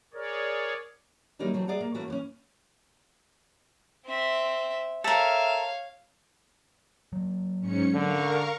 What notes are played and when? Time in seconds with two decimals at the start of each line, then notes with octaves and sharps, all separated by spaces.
0.14 G#4 A#4 C#5 D5
1.39 D#3 F#3 G3 A#3 D#4 E4
1.54 E3 F#3 A3 C4
1.67 G#3 G#4 D5 E5 F#5 A#5
1.81 A#3
1.94 E3 A3 A#3 C#4 F#4 B4
2.08 E3 B3 C#4
4.06 C4 E5
5.04 A4 A#4 C#5 E5 F5
7.13 F#3 A#3
7.59 G#2 C#4 C#7
7.94 D3 A#4 F5 C#6